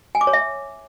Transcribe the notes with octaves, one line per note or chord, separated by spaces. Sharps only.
G#5
D6
C#5
E5